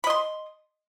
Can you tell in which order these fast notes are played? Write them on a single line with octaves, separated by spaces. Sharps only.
B5 D#5 C6